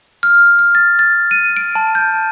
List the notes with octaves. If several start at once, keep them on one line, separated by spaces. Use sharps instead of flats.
F6
F6
A6
A6
D#7
D7
A5
G6